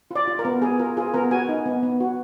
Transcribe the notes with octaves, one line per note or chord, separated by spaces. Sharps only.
F4 D5
F4
A#4
B3
B3 G#4
F4 A#4
F4 G#4
B3 A#4
F#4 G#5
D#4
B3
B3
F#4